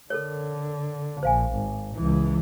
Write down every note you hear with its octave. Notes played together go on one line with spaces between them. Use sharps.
D3 A4 A#4 C#5
A#1 C5 F5 G#5
G#1
C#2 E3